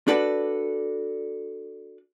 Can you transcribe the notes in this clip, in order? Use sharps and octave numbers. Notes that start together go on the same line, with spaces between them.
D4 F#4 A4 B4 D5